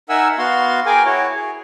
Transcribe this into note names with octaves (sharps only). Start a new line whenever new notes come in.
D#4 A#4 E5 F#5 G#5 E6
B3 F#4 F5 C6
G#4 A#4 G5 G#5 D6
E4 F#4 C#5
G#4